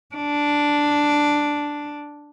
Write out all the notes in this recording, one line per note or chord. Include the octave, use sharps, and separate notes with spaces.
D4